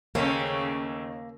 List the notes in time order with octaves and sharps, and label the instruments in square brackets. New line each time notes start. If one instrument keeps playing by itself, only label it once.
[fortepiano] D#2 [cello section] C#3 [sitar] A3 C4 C#4 [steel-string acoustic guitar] A#3